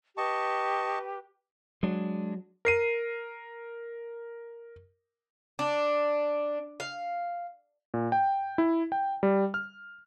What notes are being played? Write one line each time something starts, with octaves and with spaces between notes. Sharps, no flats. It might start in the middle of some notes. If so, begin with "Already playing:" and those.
G4 B4 D#5 A5 C#6
F#3 G#3 D4
A#4 C7 D#7
D4
F5
A#2
G5
E4
G5
G3
F6